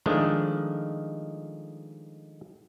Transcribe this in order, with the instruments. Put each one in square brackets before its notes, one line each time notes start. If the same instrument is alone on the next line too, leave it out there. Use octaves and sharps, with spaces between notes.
[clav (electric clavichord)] D#3 F3 G#3 A3 D4